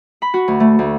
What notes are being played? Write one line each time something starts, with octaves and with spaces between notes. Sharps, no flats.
B5
F#4
D2
A3
D2